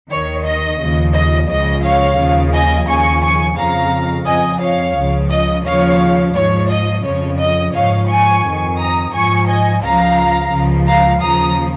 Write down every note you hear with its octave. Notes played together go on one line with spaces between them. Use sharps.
D#2 D#3 C#5
D#5
D#2 C#3 F3
D#5
C#2 C#3 F3 D#5
C#5 F5
D#2 C#3 F3
D#5 G#5
D#2 C#3 F3 G#5 C#6
G#5 C#6
F2 C#3 F3 F5 A#5
F2 F3 D#5 G#5
C#5 F5
C#2 C#3 F3
D#5
D#2 C#3 F3 C#5 F5
G#2 F3 C#5
D#5
F2 C#3 F3 C#5
D#5
G#2 F3 C#5 F5
G#5 C#6
F2 D#3
A#5 D#6
G#2 F3 G#5 C#6
D#5 G#5
C#2 C#3 F3 F5 A#5
C#2 C#3 F3
F5 A#5
D#2 C#3 F3 A#5 D#6